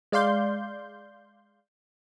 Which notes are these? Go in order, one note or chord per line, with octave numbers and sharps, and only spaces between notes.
G#3 D5 F5 C6 G6